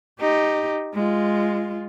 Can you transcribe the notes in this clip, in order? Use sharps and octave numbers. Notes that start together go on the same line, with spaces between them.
D#4 G4
G#3 F4